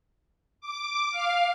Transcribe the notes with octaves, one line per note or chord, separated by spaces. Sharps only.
D6
F5